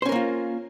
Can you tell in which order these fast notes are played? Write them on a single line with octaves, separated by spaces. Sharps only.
C5 C#4 A#4 A#3 F4